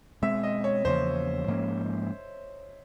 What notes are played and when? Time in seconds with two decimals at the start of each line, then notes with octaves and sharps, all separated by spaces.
0.22 B2 G#3 C4 E5
0.43 D#5
0.64 C#5
0.85 E2 C#3 F3 A#3 C5
1.48 G#2 F3 A#3 C#4